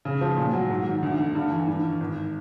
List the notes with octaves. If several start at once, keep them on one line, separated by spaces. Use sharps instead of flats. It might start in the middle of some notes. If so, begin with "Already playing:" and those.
C#3
F3
A#2
F#3
G#2
D#3
D2
D3
G2
E3
G2
D#3
G#1